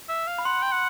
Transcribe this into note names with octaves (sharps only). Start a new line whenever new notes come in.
E5
F5
B5
F#5 C6
G5
F#5